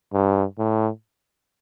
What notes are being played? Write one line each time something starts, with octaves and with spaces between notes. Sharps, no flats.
G2
A2